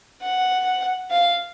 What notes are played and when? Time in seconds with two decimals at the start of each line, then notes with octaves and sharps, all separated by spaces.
0.22 F#5
1.11 F5